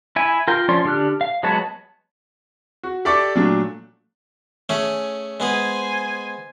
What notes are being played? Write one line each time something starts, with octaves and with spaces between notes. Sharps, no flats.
E4 G#5
F4 A#4 G5
F3 C#4 D5 C6
D3 D4 G4 F6 F#6
F5
F#3 G#3 B3 F#4 A5
F#4
G4 A4 D5 E5 C#6 D6
A#2 F#3 A3 D4
A3 C#4 G#4
G#3 B3 G#4 C5 G#5